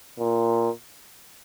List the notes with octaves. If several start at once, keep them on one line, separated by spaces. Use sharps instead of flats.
A#2